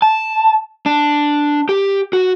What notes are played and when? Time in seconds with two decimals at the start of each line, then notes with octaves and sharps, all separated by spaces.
0.02 A5
0.86 D4
1.69 G4
2.13 F#4